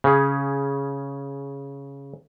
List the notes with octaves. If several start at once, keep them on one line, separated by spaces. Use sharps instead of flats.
C#3 C#4 G#4